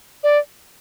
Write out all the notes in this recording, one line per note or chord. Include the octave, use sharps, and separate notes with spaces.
D5